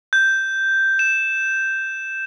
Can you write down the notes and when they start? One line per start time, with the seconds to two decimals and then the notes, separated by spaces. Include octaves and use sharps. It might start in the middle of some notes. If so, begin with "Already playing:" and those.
0.13 G6
0.99 E7